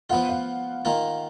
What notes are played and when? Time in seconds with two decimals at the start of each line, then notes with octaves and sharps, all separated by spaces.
0.10 F3 B3 F4 F#5
0.29 F5
0.85 D#3 A#3 F4